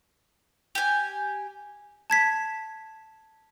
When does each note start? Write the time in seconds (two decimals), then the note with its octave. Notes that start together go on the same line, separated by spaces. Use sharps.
0.75 G4 G#5
2.10 A5 G#6 B6